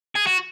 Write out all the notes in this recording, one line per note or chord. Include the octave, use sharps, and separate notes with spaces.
G#4
F#4